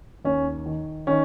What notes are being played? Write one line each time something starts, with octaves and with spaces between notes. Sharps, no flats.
D#2 C#4
D#3
D#3 C#4